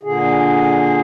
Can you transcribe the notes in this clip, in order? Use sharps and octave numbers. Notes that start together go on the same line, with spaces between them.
A#2 D3 G#4